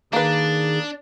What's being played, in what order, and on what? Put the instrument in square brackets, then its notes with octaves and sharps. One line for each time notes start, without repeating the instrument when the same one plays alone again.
[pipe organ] D#3 D#4 G#4 [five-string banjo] A#3 B4 [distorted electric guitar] D4